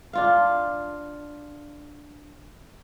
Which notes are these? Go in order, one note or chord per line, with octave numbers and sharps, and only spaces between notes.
D4 F4 F5